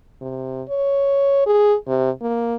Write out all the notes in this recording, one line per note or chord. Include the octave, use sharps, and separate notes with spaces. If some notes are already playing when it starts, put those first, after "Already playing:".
C3
C#5
G#4
C3
A#3